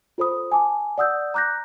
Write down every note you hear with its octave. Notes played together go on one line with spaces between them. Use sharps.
F4 A4 C5 B5 D#6
G#5 A5 D6
D5 F#5 D#6 E6 G6
A#5 D6 F#6 G6 A#6